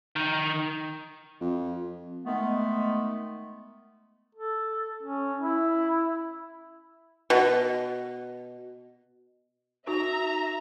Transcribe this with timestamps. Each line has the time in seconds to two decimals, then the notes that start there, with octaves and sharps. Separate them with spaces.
0.16 D#3
1.40 F2
2.25 D#3 G#3 A3 B3
4.35 A4
5.03 C#4
5.40 E4
7.30 B2
9.87 D#4 F#4 E5 A#5